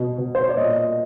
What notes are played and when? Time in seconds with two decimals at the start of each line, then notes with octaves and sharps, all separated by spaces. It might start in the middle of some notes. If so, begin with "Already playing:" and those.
Already playing: B2
0.18 B2
0.35 C5
0.43 C#5
0.49 D5
0.57 A#2 D#5
0.77 D#5